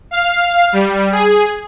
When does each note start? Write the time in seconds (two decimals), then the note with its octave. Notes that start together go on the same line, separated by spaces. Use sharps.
0.11 F5
0.73 G3
1.12 G#4